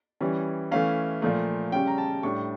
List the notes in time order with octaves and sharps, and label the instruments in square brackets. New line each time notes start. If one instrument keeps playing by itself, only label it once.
[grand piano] E3 G3 C#4
E3 A3 C#4 F5
A#2 F3 A3
C#3 G3 C#4 G5
A#5
A5
A2 G3 D4 C#6